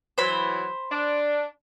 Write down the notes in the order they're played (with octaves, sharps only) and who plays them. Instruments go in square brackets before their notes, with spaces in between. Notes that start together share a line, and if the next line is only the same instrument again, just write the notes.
[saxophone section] E3 F#3 [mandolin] C5 B5
[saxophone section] D4